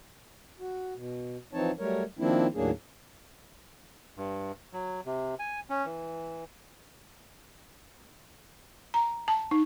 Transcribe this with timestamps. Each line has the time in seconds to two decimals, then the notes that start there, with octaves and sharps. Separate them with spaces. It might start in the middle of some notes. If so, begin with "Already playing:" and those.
0.60 F#4
0.95 B2
1.53 E3 F3 C4 D#4 C#5 A5
1.79 F#3 G3 A3 A#4 C#5
2.19 D#3 F3 A#3 C4 D4 E4
2.55 D#2 A2 F#3 A#3 D4 G#4
4.17 G2
4.73 F#3
5.06 C3
5.39 G#5
5.70 C#4
5.85 E3
8.94 A#5
9.28 A5
9.51 D#4